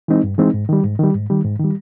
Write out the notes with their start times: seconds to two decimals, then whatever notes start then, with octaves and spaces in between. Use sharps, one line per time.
0.08 E3 G#3 C4 D#4
0.24 G2
0.38 E3 G#3 C4 D#4
0.54 G#2
0.69 D#3 G3
0.84 G#2
0.99 D#3 G3
1.15 G#2
1.30 D#3 G3
1.45 G#2
1.59 D#3 G3